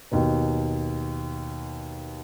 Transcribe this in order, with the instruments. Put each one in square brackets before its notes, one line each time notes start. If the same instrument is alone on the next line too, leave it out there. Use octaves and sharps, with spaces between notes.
[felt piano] D#2 B2